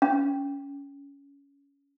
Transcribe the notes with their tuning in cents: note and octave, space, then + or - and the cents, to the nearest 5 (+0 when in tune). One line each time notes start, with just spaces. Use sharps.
C#4 +20